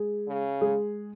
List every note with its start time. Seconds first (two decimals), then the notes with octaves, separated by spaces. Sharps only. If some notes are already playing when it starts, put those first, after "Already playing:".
Already playing: G#3 G#4
0.27 C#3
0.61 G#3 G#4